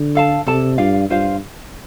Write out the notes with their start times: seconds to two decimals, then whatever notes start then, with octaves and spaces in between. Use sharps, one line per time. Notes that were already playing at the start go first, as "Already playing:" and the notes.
Already playing: D3
0.15 A4 F5 A5
0.46 C3 A4 D5 A5
0.78 G2 F4 D5 F5
1.10 G2 F4 C5 F5